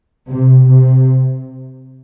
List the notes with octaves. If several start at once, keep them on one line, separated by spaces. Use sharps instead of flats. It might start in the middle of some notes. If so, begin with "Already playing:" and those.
C3
C3